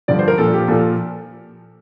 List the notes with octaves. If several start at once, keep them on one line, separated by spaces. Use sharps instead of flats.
G2 D3 F3 D5
C5
A#4
A#2 F3 A4
G4
A#2 F3 A4